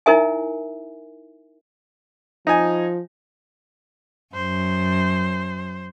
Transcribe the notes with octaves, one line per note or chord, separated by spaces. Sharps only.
D#4 E4 A#4 E5 G#5
F3 D#4 G#5
F#2 C5